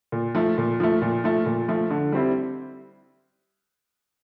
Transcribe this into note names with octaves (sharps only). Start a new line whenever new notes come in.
A#2
F3 A3
A#2
F3 A3
A#2
F3 A3
A#2
F3 A3
D3
G3 C4 E4